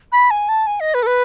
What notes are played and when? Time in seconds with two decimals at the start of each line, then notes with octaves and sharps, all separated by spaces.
0.12 B5
0.31 G#5
0.49 A5
0.67 G#5
0.80 D#5
0.94 B4
1.03 A4
1.07 B4